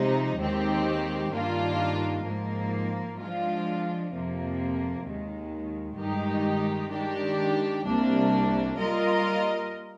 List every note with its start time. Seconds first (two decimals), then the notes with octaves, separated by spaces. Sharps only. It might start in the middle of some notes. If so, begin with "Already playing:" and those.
Already playing: C3 F3 G#3 D#4
0.38 D#2 D#3 G#3 C4 G4
1.33 G2 D#3 A#3 D4 F4
2.25 G#2 F3 A#3
3.18 F3 G#3 D4 F4
4.12 F2 C3 F3 A#3
5.04 D#2 D#3 G#3
5.98 G2 D#3 G#3 D#4 G4
6.90 D#3 G#3 D4 G4
7.84 C2 C3 G3 A#3 D4
8.77 G3 A#3 F4 A#4 D#5